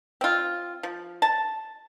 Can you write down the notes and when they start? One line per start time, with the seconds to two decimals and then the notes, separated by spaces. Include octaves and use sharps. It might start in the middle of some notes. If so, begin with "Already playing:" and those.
0.21 C4 F4
0.83 F3
1.22 A5